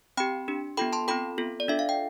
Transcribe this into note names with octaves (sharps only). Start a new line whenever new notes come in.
C4 G4 G5 B5
D4 G4
B3 F4 A4 G5 B5
A5 C6
C4 F4 A4 G5 B5
B3 F4 A4
D5
D4 F4 A4 E5
F5
G5